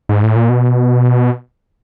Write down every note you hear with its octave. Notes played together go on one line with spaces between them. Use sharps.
G#2
A2
A#2
B2